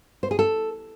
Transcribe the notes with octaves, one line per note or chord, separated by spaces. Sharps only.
C5
G#4
A4